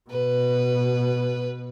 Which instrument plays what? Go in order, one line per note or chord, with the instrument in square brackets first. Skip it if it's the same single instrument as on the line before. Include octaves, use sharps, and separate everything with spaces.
[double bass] B2 [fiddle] B4